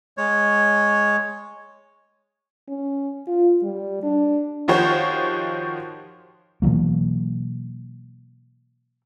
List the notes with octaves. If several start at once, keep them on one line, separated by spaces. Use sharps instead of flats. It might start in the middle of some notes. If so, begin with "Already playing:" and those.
G#3 C#5
C#4
F4
G3
D4
D#3 F3 F#4 G4 C5 C#5
B2 E3 F#3 A#3